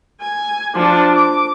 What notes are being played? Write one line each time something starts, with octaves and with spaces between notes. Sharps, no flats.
G#5
F3 D4
D6